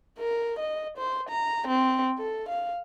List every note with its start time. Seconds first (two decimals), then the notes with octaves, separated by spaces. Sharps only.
0.19 A#4
0.59 D#5
0.98 C5
1.30 A#5
1.68 C4
2.18 A4
2.49 F5